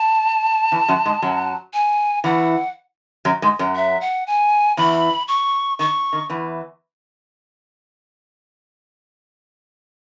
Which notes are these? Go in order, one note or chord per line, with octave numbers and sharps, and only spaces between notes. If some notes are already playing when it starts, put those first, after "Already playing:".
Already playing: A5
E2 E3
F#2 F#3
G#2 G#3
F#2 F#3
G#5
E2 E3 F#5
F#2 F#3
G#2 G#3
F#2 F#3
E5
F#5
G#5
E2 E3 B5
C#6
D#3 C#6
D#3
E2 E3